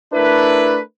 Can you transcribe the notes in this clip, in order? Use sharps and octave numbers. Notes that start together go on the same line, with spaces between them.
A3 D4 E4 A#4 B4